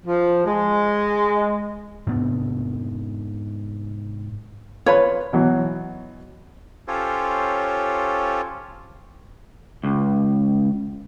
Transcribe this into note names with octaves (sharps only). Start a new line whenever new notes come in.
F3
G#3
G#2 C3 B3 D4
F4 B4 C#5 B5
B2 E3 F#3
C#4 F4 G4 A4 C5 C#5
C#2